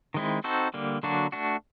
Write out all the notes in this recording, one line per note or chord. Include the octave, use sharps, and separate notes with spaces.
D#3 G#3 C4 E4
C4 D#4 F#4 A4 C5
D3 G3 A#3
D3 F#3 A#3 D4 F#4
A3 D4 F#4